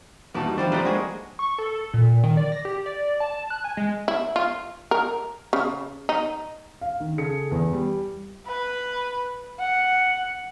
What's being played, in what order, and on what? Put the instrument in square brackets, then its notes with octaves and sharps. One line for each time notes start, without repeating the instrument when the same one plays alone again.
[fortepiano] D#2 B2 A5 [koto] E3 D#4 [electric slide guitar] G3 E4
[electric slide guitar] E3 [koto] F3 G3 C5 [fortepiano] D4
[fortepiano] F3 D4 A#4 [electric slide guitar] A3 C4 G4 [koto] B4 D#5
[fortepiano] G#3 [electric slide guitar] A#3 [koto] F#4 G#4
[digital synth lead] C#6
A4
A#2
D#3
D5
A#6
G4
D5
A5
F#6
G#5
G#3
[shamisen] E4
F4
A#4
C#3
D#4
[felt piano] F5
D#3
C#3 G#4 A4 C#7
E2
G3
[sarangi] B4
F#5